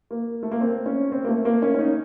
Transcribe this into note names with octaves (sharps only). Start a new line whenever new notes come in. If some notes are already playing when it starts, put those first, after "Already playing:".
A#3
A3
A#3
C4
C#4
C4
A#3
A3
A#3
C#4
C#4
D#4